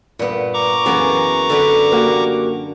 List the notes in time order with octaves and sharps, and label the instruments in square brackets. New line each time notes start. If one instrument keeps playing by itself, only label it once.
[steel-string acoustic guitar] G2 B4 [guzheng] A#2 B3
[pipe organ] A#5 C#6 D6
[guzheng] F#2 E3 A#3 [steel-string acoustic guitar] B3 G#4
[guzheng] D3 D4 B4
[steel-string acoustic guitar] A#3 F#4 G4